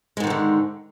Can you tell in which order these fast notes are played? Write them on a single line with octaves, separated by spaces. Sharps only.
G#3 G#2 D#3 F3 D3